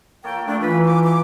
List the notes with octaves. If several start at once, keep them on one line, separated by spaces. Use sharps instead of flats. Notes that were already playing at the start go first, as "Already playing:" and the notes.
A#3 A4 C#5 G5
F3 A3 A#3 D4
E3 F3 B4
C5 D6
G#3 D6